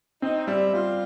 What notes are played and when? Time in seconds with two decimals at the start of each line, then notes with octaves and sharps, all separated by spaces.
0.22 C4 D#4
0.48 G3 E4
0.73 G3 F4